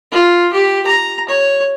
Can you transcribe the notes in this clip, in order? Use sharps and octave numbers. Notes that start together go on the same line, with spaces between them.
F4
G4
A#5
C#5